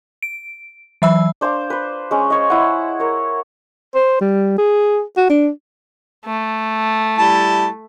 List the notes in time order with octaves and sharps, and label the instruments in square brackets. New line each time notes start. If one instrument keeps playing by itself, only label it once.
[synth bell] D7
E3 F#3 E5 B5 E6
[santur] D4 C5 F5 D6
B4 C5
G#3 C#4
C5 C#5 D#5
E4 F#5
A#4 C#5
[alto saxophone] C5
G3
G#4
F#4
D4
[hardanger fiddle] A3
[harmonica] G3 E4 A5